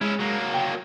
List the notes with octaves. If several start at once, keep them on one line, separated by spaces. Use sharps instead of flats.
G#3 C#4 E4
F#3 A#3
A#4 G5